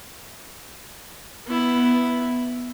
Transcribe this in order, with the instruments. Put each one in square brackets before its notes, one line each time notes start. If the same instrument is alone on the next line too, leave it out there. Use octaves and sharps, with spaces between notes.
[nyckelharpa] B3 E4